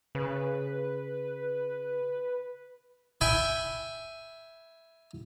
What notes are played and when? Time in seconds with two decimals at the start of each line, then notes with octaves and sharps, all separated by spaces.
0.15 C#3 B4
3.21 E5 G5 G#5 B5